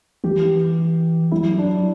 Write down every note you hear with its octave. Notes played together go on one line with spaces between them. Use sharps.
E3 G4
F#3 E4
D4